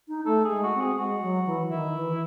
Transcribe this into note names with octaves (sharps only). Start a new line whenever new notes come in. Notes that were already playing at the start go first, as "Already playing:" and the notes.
D#4
A3 A4
G#4
G#3
F#4
C4
G#4
G#3 F#4
F#3
E3
D#3 E4
E3